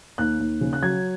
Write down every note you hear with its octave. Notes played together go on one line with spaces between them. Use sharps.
D#2 F#6
D#2
C#3
F#6
F#3 G#6